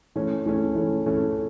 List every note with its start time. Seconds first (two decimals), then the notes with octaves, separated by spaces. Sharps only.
0.16 E3 A3 C#4
0.46 E3 A3 C#4
0.75 E3 A3 C#4
1.06 E3 A3 C#4